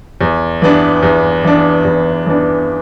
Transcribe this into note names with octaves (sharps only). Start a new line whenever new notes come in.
E2
E3 B3 D4
E2
E3 B3 D4
E2
E3 B3 D4